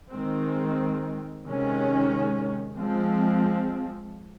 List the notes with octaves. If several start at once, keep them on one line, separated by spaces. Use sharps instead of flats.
D#3 G#3 C4
C3 D#3 G#3 C#4
F3 G#3 C4